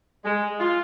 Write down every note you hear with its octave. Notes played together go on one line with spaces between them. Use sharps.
G#3
F4